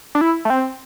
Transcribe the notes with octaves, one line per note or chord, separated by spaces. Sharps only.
D4
E4
A3
C4